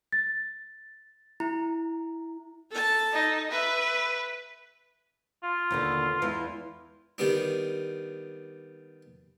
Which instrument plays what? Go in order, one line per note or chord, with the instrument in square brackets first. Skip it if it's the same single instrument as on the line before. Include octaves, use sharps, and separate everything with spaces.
[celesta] A6
[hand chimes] E4 [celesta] A#5
[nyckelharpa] A4 A5
[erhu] D#4
[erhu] B4 [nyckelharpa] E5
[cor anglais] F4
[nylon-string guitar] D#2 B2 D3
E2 E3 G#3
[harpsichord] D#3 G3 B3 D4